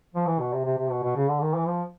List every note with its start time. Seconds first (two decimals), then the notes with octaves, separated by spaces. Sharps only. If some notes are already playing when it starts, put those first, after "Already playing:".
0.15 F3
0.27 E3
0.40 B2
0.53 C3
0.65 C3
0.78 C3
0.91 B2
1.04 B2
1.16 C#3
1.29 D3
1.42 D#3
1.55 E3
1.67 F3